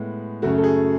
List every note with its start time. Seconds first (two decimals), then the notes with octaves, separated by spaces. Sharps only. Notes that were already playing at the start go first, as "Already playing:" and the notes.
Already playing: A2 G#3 B3
0.42 F#2 C#3 F#3 A3 F#4
0.58 A4
0.64 G#4